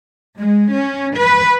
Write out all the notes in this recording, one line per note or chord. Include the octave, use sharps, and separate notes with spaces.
G#3
C#4
B4